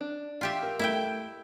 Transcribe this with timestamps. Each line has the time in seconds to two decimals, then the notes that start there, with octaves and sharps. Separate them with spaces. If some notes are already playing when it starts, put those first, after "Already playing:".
0.01 D4
0.41 F4 G4 E5
0.63 A#4
0.79 A3 E4 E5 G5